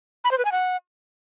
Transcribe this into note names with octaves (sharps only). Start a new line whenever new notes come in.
B5
C5
B4
G#5
F#5